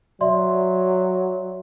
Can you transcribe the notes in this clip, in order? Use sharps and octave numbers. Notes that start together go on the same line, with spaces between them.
F#3 D5 E5 C6